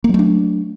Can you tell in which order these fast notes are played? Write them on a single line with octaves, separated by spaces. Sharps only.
A#3 F#3 A3 D4